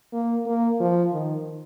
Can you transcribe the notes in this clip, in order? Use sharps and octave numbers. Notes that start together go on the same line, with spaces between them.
A#3
A#3
F3
D#3